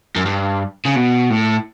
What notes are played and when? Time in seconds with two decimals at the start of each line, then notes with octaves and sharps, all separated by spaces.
0.16 F#2
0.26 G2
0.85 C#3
0.95 B2
1.30 A2